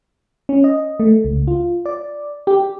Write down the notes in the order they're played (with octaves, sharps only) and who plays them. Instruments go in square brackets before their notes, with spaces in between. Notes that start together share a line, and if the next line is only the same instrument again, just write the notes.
[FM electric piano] C#4
D#5
A3
C#2
F4
D5
G4